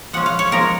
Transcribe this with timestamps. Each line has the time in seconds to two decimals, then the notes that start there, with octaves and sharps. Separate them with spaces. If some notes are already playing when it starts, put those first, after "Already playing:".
0.13 F3 G#3 C#4 F#5
0.26 F5
0.39 C#5
0.52 F3 G#3 C#4 A#4